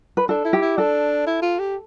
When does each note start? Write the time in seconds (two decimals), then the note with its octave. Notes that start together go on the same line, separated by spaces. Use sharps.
0.17 B4
0.29 D4 A4
0.45 E4
0.53 G4
0.62 E4
0.77 D4 A4
1.27 E4
1.42 F4
1.59 G4